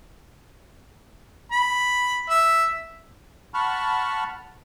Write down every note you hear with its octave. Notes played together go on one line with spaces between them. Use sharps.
B5
E5
F#5 A5 B5 C#6 F6